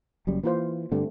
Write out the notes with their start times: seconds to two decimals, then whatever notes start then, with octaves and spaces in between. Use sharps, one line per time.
0.27 F#1 F#2 G3
0.44 E3 A#3 F4 C5
0.92 G2 D3 G3 A3 C4